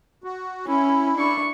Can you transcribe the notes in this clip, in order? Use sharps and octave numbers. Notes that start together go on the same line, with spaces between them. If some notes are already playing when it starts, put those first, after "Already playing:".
F#4
C#4 E4
D4 C#6